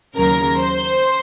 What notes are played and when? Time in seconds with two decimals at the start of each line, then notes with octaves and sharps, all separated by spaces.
0.17 D#2 C#3 F#3 A#4 A#5
0.59 C5 C6